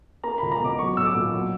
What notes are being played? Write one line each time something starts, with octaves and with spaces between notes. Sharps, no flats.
A#3 A#5
C#2 B5
A#5
B2 D6
F#3 C#6
B1 E6
D6
A#2
F#3